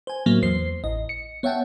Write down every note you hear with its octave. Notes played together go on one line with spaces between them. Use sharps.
C5 G#5
A2 F#3 A#3
E2 C5 C7
A1 D#5
C#7
B3 C#5 E5 F#5 G5 A5